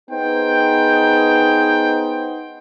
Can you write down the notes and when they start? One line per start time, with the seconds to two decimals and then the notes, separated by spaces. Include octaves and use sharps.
0.10 B3 D#4 G#4 C5 G5